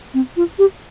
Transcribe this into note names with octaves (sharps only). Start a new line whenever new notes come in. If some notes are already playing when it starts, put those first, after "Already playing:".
C4
F4
G4